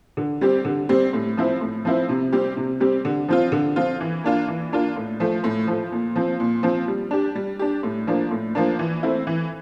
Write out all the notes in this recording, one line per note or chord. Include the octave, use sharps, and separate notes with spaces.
D3
G3 C4 G4
D3
G3 C4 G4
A2
F3 C4 E4
A2
F3 C4 E4
C3
G3 C4 G4
C3
G3 C4 G4
D3
F3 C4 F4
D3
F3 C4 F4
E3
A#3 D4 F4
E3
A#3 D4 F4
A2
F3 A3
A2
F3 A3
A#2
F3 C4
A#2
F3 C4
G3
D4 G4
G3
D4 G4
A2
F3 A#3 D4
A2
F3 A#3 D4
E3
A3 C4 E4
E3